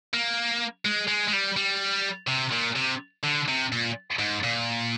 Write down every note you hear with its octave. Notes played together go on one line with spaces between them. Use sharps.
A#3
G#3
G#3
G#3
G3
G3
C3
A#2
C3
D3
C3
A#2
G#2
A#2